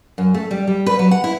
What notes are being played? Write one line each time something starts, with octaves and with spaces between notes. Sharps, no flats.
F#2
A3
G3
G3
B4
F#3
F#5
E4